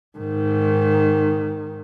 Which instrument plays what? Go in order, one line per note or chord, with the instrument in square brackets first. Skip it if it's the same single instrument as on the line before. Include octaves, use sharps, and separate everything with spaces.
[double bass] G#2 D#3